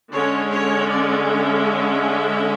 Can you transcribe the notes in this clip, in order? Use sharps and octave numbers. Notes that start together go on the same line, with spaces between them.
D3 G#3 C#4 C#5
C#5
D5
E5